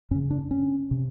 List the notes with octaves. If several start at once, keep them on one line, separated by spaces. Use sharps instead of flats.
F#2 C#3 C#4
D4
C#4
C3